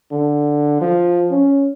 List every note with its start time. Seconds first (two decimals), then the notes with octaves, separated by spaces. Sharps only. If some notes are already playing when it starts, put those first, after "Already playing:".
0.11 D3
0.81 F3
1.31 C#4